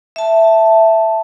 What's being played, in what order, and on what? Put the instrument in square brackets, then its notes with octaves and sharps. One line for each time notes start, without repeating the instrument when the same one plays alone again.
[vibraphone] E5 A5